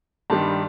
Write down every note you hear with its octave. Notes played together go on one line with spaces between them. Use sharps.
G2 D#3 G3 A5 C6